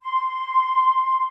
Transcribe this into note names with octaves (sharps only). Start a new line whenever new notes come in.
C6